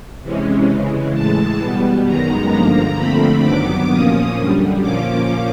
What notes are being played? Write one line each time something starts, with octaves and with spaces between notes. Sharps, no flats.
C3 E3 G#3 C#4
C#3 E3 G#3
A2 E3 G#3 A5
B2 G3 B3
F#2 D#3 G#3 B3 A#5
G2 D3 F3 A#3 A#5
D3 F3 A3 C4 B5
G2 D#3 F#3 B3 D6
A#2 F3 A#3 C#4 D#6
F#2 D3 G3
A#2 F3 A#3 C#4 D6